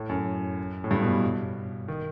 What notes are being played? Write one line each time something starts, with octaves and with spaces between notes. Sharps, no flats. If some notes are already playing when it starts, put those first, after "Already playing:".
Already playing: A2
F#2
A2
G2
B2
D#3